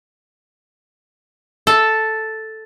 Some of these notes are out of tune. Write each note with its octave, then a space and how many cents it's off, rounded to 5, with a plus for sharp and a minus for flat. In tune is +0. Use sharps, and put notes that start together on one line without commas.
A4 +0